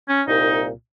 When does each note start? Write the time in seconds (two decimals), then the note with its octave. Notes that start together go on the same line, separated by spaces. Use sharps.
0.09 C#4
0.26 C2 A#2 D#4